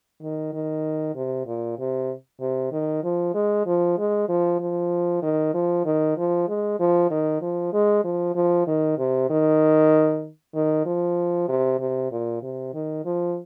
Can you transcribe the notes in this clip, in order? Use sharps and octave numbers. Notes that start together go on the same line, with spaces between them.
D#3
D#3
C3
A#2
C3
C3
D#3
F3
G#3
F3
G#3
F3
F3
D#3
F3
D#3
F3
G#3
F3
D#3
F3
G#3
F3
F3
D#3
C3
D#3
D#3
F3
C3
C3
A#2
C3
D#3
F3